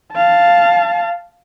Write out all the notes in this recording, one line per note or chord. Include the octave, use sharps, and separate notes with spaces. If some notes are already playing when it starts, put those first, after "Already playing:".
F5 A5